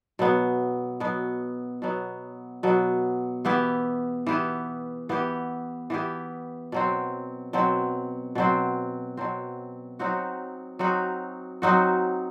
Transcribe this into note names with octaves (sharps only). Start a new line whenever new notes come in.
B2 F#3 B3
B2 F#3 B3
B2 F#3 B3
B2 F#3 B3
E3 B3 E4 G4
E3 B3 E4 G4
E3 B3 E4 G4
E3 B3 E4 G4
B2 F#3 C4
B2 F#3 C4
B2 F#3 C4
B2 F#3 C4
F#3 C4 D#4 F#4
F#3 C4 D#4 F#4
F#3 C4 D#4 F#4